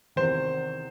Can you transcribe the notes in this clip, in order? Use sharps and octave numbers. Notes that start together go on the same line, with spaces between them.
E2 C3 D#3 C5